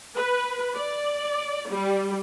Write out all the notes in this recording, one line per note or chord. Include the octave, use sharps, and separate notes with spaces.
B4
D5
G3